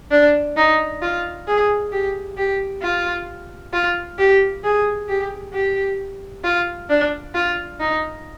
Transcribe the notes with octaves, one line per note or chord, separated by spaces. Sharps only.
D4
D#4
F4
G#4
G4
G4
F4
F4
G4
G#4
G4
G4
F4
D4
F4
D#4